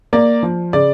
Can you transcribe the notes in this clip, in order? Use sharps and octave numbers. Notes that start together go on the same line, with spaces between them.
A#3 D5
F3
C#3 D5